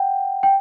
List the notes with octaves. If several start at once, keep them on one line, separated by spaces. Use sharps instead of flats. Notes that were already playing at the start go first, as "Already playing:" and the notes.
Already playing: F#5 G5
G5